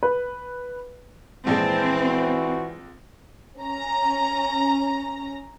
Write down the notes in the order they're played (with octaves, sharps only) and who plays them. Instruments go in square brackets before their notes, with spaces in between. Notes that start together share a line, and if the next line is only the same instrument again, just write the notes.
[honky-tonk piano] B4
[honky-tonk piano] A#1 G#3 [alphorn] E3 [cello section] C4 [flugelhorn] A5
[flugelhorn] F#4
[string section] C#4 A#5